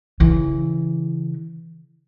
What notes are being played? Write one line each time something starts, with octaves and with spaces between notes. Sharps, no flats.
C#3 E3